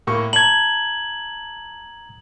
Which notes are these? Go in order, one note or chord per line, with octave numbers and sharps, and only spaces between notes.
A2 A#3 C#6
A5 A#5 G#6 F#7